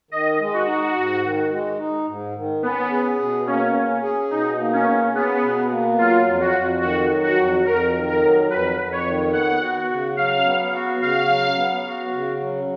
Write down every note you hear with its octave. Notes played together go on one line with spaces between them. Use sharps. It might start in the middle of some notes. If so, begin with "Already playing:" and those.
D#3 D#5
G#3
F#4
D#4
G#2
D#3
G#3
D#4
G#2
D#3
B3 C#4
G#4
B2
A#3 C#4
C#4
G#4
B2 D#4
A#3
C#4
C#4
B3 G#4
B2
A#3
F#3 F4
F2
F#4
F2
D#3 F#4
F#3
F#4
F2
F2 A#4
D#3
A#4
F#3
F2 B4
F2
C#5
D#3
B3 F#5
F#4
C#3
F#3 F5
B3
F#4
C#3 F5
F#3
B3
F#4
C#3
F#3